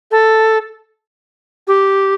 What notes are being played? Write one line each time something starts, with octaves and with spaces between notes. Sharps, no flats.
A4
G4